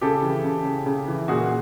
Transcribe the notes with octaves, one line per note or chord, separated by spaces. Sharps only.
C#3 G4 A4
E3
C#3
C#3
C#3
E3
A#2 F#4 G#4